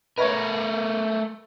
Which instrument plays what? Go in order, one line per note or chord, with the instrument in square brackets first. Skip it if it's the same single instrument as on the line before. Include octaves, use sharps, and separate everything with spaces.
[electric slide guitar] A3 A#4 [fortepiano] B4 C#5